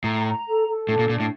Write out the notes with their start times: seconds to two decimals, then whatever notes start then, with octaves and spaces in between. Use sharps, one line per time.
0.04 A2 A#5
0.25 A#5
0.47 A4
0.67 A4
0.88 A2 D4
0.99 A#2
1.10 A#2 D4
1.20 A2